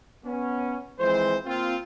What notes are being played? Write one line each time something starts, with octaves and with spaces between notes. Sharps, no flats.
B3 C#4
E3 F3 G#3 C4 C5
A#3 C4 F4